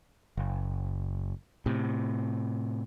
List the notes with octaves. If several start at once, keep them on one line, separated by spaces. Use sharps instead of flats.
F#1
A2 C3